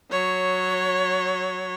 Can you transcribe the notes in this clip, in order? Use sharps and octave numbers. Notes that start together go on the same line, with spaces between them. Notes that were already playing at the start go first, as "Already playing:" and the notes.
F#3 C#5